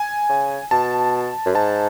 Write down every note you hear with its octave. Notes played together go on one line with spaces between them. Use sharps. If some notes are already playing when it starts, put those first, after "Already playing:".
Already playing: G#5
C#3
B2 A5
F#2
G#2 A5